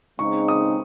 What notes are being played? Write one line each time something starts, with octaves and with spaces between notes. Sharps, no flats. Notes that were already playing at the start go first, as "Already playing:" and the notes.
C#3 G#3 C4 D#4 C#6
D#6